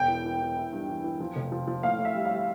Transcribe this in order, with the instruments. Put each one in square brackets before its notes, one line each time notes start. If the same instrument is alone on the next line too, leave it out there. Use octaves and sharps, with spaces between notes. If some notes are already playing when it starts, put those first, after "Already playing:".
Already playing: [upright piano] E1 [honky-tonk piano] G5
[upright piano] E3
E3
E3
E4
G2
E3
E3
F3
F1
F3
F3
[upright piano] A2 [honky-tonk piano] F5
[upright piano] A2
[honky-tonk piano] E5
[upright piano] G3
[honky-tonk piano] F5
[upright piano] G3